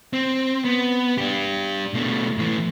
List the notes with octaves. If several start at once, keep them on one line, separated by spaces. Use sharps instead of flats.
C4
B3
D4 G4
B2 A3
A2 E3